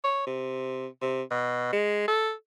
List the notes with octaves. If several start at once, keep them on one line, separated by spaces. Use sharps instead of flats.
C#5
C3
C3
B2
G#3
A4